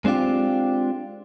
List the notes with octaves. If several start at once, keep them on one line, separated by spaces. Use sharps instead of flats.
G#3 C4 D4 F4 G4